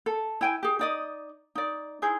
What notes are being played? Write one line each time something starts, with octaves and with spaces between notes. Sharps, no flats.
A4
E4 G5 G#5
G4 G#4
D#4 D5 D#5
D#4 D5
D#4 E4 G#4 C5